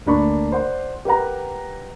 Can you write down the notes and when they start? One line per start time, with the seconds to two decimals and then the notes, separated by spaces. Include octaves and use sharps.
0.06 D2 A#3 D4 B5 C#6
0.52 C5 D5 F#5 C6
1.05 G4 A#4 B4 F#5 A#5